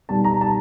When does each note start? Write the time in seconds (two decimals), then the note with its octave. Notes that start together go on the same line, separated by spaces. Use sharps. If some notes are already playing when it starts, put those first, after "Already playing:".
0.09 B2 G3 B3 D#4 A5
0.24 A#5
0.41 A5